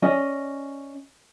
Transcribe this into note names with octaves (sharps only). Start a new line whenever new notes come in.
C#4 D5 D#5 G#5